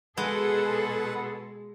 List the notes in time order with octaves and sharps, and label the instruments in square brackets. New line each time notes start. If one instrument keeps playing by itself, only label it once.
[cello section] B2 G#4 A4 [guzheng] G#3 [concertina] B4 F#5